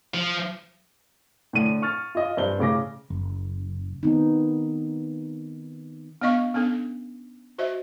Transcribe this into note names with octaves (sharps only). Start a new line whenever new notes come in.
F3
A2 D3 D#7
C#6 F6 A6
F4 D#5
G2 C5 G7
A2 C#3 D6 A#6
F#1
D#3 B3 C4 D#4
B3 D4 D#5 F5 C#6
B3 C#4 D4 A4
F#4 C5 D#5 E5